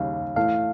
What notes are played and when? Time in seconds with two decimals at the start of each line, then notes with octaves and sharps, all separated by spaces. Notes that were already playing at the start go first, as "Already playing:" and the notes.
Already playing: D#2 C#3 G3 F5
0.36 A2 E3 A3 F5